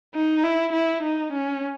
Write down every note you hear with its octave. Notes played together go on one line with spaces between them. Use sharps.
D#4
E4
E4
D#4
C#4